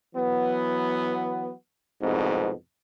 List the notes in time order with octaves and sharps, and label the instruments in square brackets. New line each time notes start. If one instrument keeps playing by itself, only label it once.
[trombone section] E3 F#3 B3
C2 F2 G#2 B2